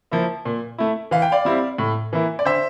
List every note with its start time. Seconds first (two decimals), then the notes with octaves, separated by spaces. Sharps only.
0.12 F3 A#3 E4
0.45 A#2
0.78 A3 E4
1.11 E3 F5
1.22 G5
1.32 D5 F5
1.45 G3 C4 E4
1.78 A2
2.13 E3 A#3 E4
2.39 D5
2.45 D3 C5 E5